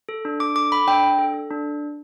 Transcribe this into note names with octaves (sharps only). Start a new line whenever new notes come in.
A4
D4
D4 D6
A4 D6
A4 B5
D4 G5
D4
A4
A4
D4